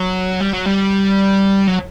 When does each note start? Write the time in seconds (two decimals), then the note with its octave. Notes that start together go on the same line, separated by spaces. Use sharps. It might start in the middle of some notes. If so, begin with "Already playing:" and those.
Already playing: F#3
0.41 G3
0.53 F#3
0.66 G3
1.68 F#3